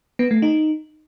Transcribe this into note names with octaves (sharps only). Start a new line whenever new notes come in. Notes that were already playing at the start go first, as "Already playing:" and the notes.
B3
A3
D#4